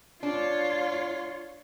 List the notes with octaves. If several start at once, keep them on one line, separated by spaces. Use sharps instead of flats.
D4 F4 C#5